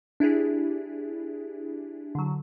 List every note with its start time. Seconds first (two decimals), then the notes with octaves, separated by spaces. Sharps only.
0.20 D4 E4 G4 G#4
2.15 D3 F#3